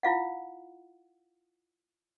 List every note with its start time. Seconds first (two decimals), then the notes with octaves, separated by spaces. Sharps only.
0.03 E4 F4 F5 F#5